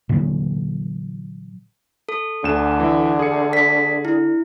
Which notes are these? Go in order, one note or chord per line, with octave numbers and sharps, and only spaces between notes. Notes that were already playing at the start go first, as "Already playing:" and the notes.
A#2 D3 E3 F#3
A4
D2 D3 E7
E3 E5
G#4 C#7
B6
E4